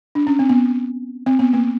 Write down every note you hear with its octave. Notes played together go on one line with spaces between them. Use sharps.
D4
C#4
C4
B3
C4
B3
A#3